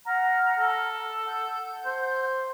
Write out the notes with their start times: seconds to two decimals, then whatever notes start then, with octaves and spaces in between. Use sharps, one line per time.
0.06 F#5 A#5 F6
0.59 A4
0.86 A5
1.25 F#5 G6
1.85 C5